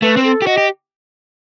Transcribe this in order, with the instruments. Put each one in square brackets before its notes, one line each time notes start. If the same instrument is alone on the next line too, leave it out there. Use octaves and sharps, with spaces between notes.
[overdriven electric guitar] A3 [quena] B4
[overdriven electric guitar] C4
[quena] A4
[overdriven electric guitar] G4
[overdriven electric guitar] F#4 [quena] D#5
[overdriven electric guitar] G4